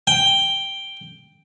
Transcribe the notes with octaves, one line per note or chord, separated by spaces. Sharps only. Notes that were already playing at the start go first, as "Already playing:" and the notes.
G5